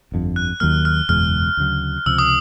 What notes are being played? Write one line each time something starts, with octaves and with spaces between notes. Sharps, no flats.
G1 F2 D3
F#6
D#2 D#3 F#3 A#3 F6
F6
F#1 E2 B2 G#3 F6
D2 C#3 F#3
C#2 C3 F3 E6
D#6